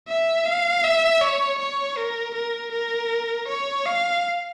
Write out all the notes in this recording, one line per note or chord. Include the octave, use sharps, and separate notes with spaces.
E5
F5
E5
C#5
C#5
A#4
A#4
A#4
C#5
F5